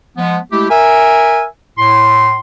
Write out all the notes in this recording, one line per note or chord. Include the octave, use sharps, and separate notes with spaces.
F3 G#3 B3
G#3 A3 E4 G4
A#4 E5 G#5
A2 C6